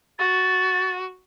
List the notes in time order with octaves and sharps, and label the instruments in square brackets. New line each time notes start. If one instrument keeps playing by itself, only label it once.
[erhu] F#4 [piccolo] A6